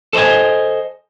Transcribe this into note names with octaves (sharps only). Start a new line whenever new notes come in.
A4 C5 D5 D#5 G#5